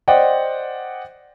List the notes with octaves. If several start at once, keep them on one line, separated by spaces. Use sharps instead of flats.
C5 D5 D#5 F#5 G5